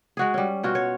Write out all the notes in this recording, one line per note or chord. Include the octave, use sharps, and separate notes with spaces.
G#3 F#4 G#4
G3 C#4
B2 F4 F#4
C#5